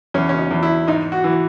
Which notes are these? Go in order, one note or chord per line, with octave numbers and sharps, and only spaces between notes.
E2 C#4
C#4
D#4
E2
E4
G#2 D#4
F#4
E3